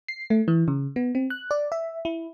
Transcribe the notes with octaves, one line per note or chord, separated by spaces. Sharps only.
C7
A3
E3
C#3
B3
C4
F#6
D5
E5
E4